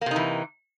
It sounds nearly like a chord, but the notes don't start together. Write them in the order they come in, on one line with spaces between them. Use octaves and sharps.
A#3 C3 D#4 E3